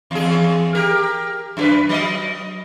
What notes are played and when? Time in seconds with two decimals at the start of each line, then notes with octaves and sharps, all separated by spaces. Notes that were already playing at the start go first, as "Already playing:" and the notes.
0.11 E2 G#4
0.75 G4 A#4
1.57 F#2 G4 B4
1.89 F#3 D#5